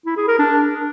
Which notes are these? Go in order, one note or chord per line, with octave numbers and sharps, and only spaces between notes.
E4
G#4
A#4
D4